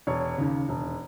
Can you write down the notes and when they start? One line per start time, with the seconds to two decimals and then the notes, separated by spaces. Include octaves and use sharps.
0.07 E1 C#5
0.38 D#2 C#3
0.69 E1